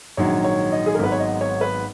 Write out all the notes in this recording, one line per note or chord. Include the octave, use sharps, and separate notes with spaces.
A#1 G#2 D#3 F#3 C#5
C#5
D#5
G#4
A#4
G#1 G#2 F#3 B3 B4
C#5
D#5
C#5
B4